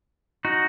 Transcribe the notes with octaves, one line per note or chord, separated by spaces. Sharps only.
D#4 F#4